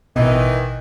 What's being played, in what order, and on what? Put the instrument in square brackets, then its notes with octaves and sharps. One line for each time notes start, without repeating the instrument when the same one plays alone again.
[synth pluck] A1 B2 [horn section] D#3 E3 [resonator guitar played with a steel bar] D#5